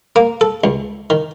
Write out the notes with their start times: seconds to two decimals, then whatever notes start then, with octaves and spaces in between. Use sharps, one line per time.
0.16 A#3
0.41 A4
0.64 C#2
1.10 D#3